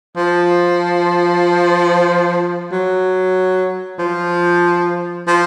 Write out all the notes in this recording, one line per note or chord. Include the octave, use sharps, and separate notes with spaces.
F3
F#3
F3
F3